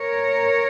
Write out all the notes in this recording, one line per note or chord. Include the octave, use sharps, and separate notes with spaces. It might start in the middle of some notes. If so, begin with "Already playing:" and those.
Already playing: A#4 C#5